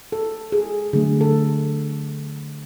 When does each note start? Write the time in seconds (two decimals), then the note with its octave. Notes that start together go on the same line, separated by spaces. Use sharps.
0.12 A4
0.52 G#4
0.93 D3 F#3 A3 G#4
1.21 A4